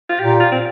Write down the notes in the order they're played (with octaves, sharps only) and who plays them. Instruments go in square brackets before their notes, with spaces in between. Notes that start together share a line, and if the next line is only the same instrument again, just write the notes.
[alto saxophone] F4
[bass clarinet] A#2 [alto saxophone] G4
[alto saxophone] F4
C4